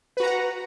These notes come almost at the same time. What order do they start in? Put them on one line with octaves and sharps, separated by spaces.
B4 F#4 A#5 F#5